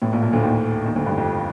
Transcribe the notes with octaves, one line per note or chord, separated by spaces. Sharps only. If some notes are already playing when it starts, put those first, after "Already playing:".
A1 A2
A#1 A#2
A#1 A#2
D2 D3
D#2 D#3
D#2 D#3
D2 D3
G2
F2